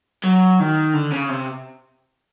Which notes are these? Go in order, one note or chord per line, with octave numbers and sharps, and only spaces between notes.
F#3
D#3
D3
C#3
C3